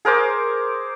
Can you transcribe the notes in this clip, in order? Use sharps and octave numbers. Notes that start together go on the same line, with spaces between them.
G#4 A#4 C5 D6